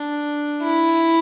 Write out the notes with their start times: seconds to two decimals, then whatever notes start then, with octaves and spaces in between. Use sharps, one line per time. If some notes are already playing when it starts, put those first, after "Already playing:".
Already playing: D4
0.63 E4